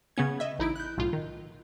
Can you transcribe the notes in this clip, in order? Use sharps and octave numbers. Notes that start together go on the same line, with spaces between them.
C#3 B3 C#4 G#6
D#5 E5
A1 D#4 E4 D7
F#6 G6
B1 A2 F4
D#3